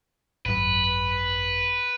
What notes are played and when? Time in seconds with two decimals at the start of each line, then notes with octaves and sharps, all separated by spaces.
0.46 G#1 F#2 B4